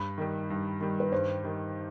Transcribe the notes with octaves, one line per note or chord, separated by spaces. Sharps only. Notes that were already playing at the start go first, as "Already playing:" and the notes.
Already playing: G2 B5
D#3 G3
G2
D#3 G3
B4
G2 C5
D#3 G3